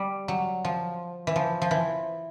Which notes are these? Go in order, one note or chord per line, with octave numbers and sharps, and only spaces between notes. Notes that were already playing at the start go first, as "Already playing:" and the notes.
Already playing: G3
F#3
F3
E3
F3
F3
E3